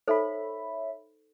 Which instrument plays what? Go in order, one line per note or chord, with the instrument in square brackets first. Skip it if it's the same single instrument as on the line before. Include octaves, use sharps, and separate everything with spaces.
[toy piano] D#4 A4 C5 [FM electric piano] C#5 E5 B5